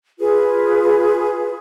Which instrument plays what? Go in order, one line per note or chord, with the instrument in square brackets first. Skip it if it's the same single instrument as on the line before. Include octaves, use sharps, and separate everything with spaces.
[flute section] F4 G#4 B4